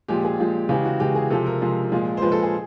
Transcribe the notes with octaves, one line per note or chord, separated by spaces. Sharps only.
A#2 F3 G#3 G4
G#4
A#2 F3 G#3
C#3 E3 G#3 G4
F#4
C#3 E3 G#3 G4
G#4
C3 F3 G#3 A4
A#4
C3 F3 G#3
A#2 F3 G#3
C5
A#2 F3 G#3 B4
A4
G#4